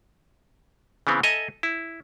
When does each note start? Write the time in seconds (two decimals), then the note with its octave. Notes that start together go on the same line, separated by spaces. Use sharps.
1.07 C#3 E3 B3 C4
1.23 A4 D#5 E5 G#5 A#5
1.63 E4